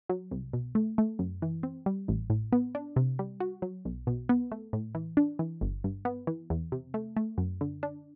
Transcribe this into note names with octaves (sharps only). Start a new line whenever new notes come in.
F#3
C2
B2
A3
A3
F#2
E3
C4
G3
A1
A2
B3
D4
C3
G3
F#4
F#3
B1
B2
B3
A3
A2
E3
D4
E3
G1
G2
B3
E3
E2
C3
A3
A3
F#2
D3
D4